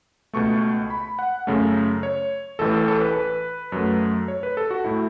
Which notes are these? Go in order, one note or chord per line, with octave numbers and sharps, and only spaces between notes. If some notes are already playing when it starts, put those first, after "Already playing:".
C#2 B2 A3 C#6
B5
F#5
F#2 C#3 A3
C#5
A1 A2 E3 A4
A4
A4
B4
B4
F#2 F#3 A3
C#5
B4
A4
F#4
A2 A3 E4